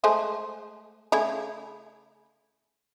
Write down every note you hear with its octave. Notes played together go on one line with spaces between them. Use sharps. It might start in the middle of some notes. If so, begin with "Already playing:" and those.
G#3 A3 C5
C#3 A3 E4